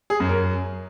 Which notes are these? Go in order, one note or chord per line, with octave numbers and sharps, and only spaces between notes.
G#4
F#2
A#4